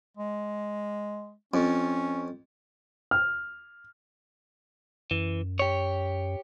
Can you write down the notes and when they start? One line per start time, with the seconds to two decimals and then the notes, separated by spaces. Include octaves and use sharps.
0.17 G#3
1.54 F2 C#4
3.11 F6
5.11 F#2 E3
5.59 G4 C#5